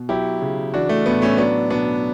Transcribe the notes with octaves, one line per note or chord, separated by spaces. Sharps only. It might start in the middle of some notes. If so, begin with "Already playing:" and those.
Already playing: B2
F#3 E4 G4
C#3
E3 D4 F#4
A3
A2 B3
A3 C#4
F#3 B3 D4
B2 B3 D4